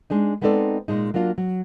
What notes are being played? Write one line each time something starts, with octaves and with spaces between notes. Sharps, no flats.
G#3 D4 D#4
G#3 B3 C4 D#4 A4 D5
A#2 G#3 D#4
F#3 A#3 D4 F4
F#3